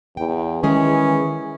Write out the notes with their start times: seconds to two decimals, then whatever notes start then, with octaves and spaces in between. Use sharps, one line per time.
0.17 E2 G5
0.63 D#3 E3 G#3 C#4 G#4